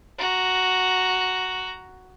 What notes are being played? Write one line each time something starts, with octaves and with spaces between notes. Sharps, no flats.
F#4 A#5